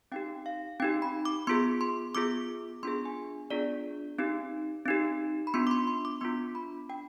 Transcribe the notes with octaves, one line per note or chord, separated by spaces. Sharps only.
C4 D#4 G4 G5
F5
C4 D#4 G4 G5
B5
D6
B3 F4 G#4 C6
C6
B3 F4 G#4 D6
B3 D4 F4 G#4 C6
G#5
B3 D4 F4 G#4 D5
C4 D#4 G4
C4 D#4 G4
B5
B3 D4 F4 C6
D6
C6
C6
D6
B3 D4 F4 C6
B5
D4 G5